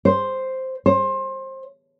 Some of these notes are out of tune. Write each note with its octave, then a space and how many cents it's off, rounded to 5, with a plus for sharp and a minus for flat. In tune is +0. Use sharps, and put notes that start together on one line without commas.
C5 +0
C5 +25